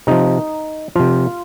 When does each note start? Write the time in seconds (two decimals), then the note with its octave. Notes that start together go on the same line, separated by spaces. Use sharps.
0.07 C3 F3 D#4
0.96 C3 F3 F4